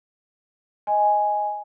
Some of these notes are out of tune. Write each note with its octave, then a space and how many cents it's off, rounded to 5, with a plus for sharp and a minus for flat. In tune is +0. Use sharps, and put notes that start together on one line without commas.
D#5 +10 G#5 +0 C6 -15